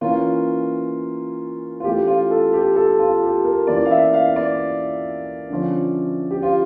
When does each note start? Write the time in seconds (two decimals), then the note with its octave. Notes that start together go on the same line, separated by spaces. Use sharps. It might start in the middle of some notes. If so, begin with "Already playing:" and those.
0.01 E3 A#3 C#4 F4
1.80 F4
1.84 E3 A3 C#4 G4
2.07 F4
2.31 A4
2.53 G4
2.76 A4
2.99 F4
3.22 G4
3.44 A#4
3.67 E3 A#3 C#4 D5
3.85 F5
3.91 E5
4.14 F5
4.36 D5
5.50 D3 F3 C#4
6.31 G4
6.43 F4